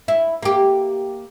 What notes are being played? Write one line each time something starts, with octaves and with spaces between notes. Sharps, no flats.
E4
A#3 G4